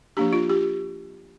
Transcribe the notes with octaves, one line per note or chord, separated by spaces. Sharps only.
F3 A#3 D4 G4
F4
G4